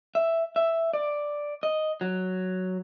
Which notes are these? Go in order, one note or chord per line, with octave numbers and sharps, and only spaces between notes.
E5
E5
D5
D#5
F#3